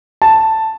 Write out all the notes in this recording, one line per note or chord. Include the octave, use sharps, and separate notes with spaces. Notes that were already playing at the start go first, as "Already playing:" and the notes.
A5